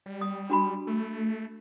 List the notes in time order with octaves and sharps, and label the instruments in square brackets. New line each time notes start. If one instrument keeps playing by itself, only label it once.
[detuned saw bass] G3
[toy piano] D#6
D4 F#4 B5
[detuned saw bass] A3